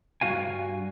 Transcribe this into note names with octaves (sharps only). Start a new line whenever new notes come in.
G2 A3 F#4 F5 G#5